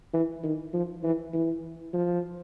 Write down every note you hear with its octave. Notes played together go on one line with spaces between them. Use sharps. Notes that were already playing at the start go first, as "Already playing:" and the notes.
E3
D#3
F3
E3
E3
F3